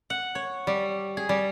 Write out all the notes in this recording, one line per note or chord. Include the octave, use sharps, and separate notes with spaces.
F#5
C#5
G3
G#4
G3